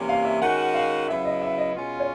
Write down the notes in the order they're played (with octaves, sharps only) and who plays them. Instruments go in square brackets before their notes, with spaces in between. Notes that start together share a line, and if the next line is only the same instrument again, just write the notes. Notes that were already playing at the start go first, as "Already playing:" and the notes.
Already playing: [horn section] C3 E3 G3 A#3 C#4
[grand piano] F5
E5
[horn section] D#3 G#3 C#4 F#4 [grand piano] F#5
[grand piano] F5
[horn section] C#3 F#3 B3 E4 [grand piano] E5
[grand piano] D#5
E5
D#5
[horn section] B2 G#3 C#4 F4
[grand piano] C#5